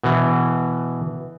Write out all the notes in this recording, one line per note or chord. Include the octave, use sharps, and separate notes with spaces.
B2 E3